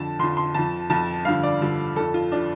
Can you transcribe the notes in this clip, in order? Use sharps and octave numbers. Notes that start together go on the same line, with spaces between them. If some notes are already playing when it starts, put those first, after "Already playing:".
Already playing: F2 D3 F3 A5
F2 D3 F3 C6
C6
F2 F3 A5
F2 F3 A5
G2 D3 F3 F5
D5
G2 D3 F3
F2 F3 A4
F4
F3 D4